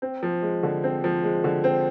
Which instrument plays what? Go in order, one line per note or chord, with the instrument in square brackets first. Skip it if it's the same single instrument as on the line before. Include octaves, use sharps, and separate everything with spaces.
[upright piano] C4
F3
G#3
D3
C4
F3
G#3
D3
C4